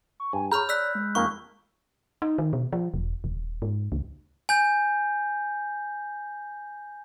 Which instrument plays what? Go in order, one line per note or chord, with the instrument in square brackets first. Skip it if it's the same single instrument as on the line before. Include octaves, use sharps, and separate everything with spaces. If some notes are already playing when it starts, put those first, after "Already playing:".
[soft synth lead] C#6
[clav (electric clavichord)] G2 [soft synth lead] G#5
[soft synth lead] G#4 [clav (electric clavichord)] C#5 A#5 [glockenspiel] B5 F6 G6
[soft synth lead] D5 [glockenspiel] E6 F#6 B6
[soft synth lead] G#3
[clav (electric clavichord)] F2 A#3 D#4 [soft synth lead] G#3 [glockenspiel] C#6
[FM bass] D#4
D#3
B2
F3
E1
D#1
G#2
C#2
[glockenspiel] G#5 G6